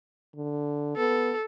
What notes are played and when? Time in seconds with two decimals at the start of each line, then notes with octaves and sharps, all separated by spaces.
0.36 D3
0.97 B3 A4